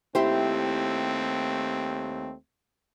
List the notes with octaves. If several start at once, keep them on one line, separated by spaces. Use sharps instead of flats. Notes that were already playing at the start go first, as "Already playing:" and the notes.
D#2 A3 C4 E4 G4 C5